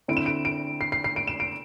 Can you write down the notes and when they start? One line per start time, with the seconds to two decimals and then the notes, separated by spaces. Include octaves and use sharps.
0.08 D3 C4 E4 D7
0.17 E7
0.26 D7
0.45 D7
0.81 C7
0.92 C7
1.04 C7
1.16 D7
1.27 E7
1.40 D7